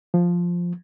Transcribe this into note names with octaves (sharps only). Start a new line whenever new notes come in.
F3